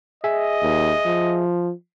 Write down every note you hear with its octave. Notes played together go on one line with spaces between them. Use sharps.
G#4 D#5 E5 G#5
D#2
F3